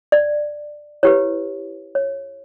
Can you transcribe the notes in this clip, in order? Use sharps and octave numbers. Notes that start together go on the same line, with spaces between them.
D5
E4 G4 B4 C#5
C#5